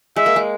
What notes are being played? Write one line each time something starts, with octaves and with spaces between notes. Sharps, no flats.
G#3 E5
A#3
G#3